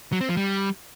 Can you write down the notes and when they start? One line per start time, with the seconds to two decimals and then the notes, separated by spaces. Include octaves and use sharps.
0.12 F#3
0.21 C4
0.29 F3
0.37 G3